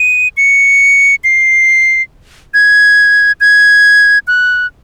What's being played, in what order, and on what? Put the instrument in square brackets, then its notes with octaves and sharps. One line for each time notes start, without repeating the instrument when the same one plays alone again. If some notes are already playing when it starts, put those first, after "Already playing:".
Already playing: [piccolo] D#7
C#7
C7
G#6
G#6
F#6